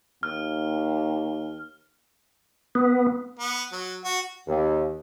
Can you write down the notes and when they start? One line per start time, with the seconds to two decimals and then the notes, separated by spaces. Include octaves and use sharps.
0.23 D#2 F6
2.75 B3
3.39 B3
3.72 F#3
4.04 F#4
4.47 D#2